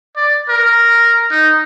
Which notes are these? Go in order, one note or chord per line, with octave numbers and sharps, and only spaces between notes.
D5
A#4
D#4